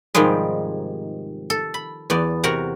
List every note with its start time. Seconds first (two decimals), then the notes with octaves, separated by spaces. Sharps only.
0.15 G#2 C3 D#3 F3 G3 G#3
1.50 A4
1.74 B5
2.10 E2 B3 D5
2.44 C3 F#4 A#4 F#5 A#5